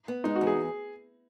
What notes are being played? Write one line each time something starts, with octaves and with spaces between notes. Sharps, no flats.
B3
G#3 D#4
F#4
E2
G#4